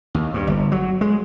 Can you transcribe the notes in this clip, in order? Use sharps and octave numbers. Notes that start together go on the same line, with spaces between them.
D#2
G2
G1
F#3
G#3